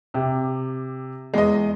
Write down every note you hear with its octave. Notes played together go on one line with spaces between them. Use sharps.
C3 G4
E2 G#3 D#5